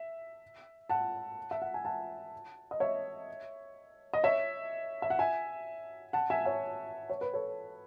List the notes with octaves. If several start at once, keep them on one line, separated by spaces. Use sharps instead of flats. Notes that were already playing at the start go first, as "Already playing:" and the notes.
Already playing: E5
F#5 A5
E5
F#5
G#5
F#5 A5
D#5
C#5 E5
D#5
C#5 E5
E5
F#5
E5 G#5
F#5 A5
E5 G#5
C#5 E5
C#5
B4
A4 C#5